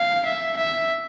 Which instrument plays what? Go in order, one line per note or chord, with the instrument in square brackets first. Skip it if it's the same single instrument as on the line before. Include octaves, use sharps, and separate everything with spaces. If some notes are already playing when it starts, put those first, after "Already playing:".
Already playing: [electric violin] F5
E5
E5